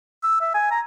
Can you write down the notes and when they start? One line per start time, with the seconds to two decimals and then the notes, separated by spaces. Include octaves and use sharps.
0.23 E6
0.41 E5
0.54 G#5
0.71 A#5